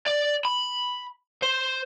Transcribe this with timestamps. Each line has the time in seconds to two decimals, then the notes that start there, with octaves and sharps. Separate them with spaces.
0.06 D5
0.45 B5
1.43 C5